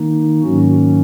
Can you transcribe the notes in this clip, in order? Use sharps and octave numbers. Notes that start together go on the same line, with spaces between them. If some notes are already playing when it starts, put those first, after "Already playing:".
Already playing: D#3 A#3 D#4
G#2 D#3 F#3 A#3 C#4 F#4